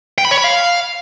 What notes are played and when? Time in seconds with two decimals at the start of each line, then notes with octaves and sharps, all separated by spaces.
0.18 G5
0.25 B5
0.31 C#5
0.38 B5
0.44 F5